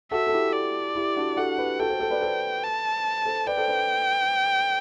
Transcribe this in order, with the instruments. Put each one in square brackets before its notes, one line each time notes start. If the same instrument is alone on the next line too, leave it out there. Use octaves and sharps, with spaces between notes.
[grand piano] F#4 A4 [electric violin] E5
[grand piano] A4
E4 G4
[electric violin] D5
[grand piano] E4 G4
D4 F#4
[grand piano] F#4 A4 [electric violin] F#5
[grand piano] G4 B4
[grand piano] F#4 A4 [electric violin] G5
[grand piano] A4 C5
A4 C5
B4 D5
A4 C5
[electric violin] A5
[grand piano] A4 C5
[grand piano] B4 D5 [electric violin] G5
[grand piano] A4 C5
B4 D5